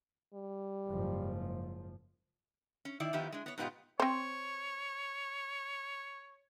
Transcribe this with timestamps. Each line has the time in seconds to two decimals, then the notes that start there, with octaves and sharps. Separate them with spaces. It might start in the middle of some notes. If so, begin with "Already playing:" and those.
0.34 G3
0.88 F#1 G#2 F3
2.85 C#4
3.00 D#3 E4 D5
3.13 D#3 F3 B3 E4 G4
3.32 G#3 D4
3.46 B3 C#5
3.58 G#2 B2 B3 F4 G4 D#5
4.00 C4 C5 C#5